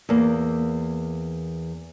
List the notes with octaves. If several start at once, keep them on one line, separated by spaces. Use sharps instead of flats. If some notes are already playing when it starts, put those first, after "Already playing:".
E2 A#3